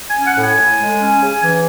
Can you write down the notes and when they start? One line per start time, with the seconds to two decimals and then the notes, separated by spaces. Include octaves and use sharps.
0.09 G#5
0.14 C#4
0.25 F#5
0.36 A2
0.41 G#5
0.56 A2
0.78 G#3
0.99 C#4
1.20 C#3
1.41 E3